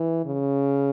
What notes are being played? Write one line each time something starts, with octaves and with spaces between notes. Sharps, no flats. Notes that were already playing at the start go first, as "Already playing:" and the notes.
Already playing: E3
C#3